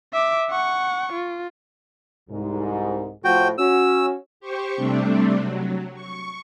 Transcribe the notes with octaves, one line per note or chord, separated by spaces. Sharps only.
E5 D6
F#5 C#6
F4
C2 G#2
A2 F3 F#4 G5
C#4 F#4 E6
G4 C5 C#6
C3 G3 A3 C4 D4
F#3
C#6